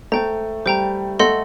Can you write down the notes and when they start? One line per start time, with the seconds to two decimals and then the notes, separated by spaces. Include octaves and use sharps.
0.12 A3 C5 G5 A#5
0.66 G3 C5 G5 A#5
1.19 A3 A4 D#5 F#5 C6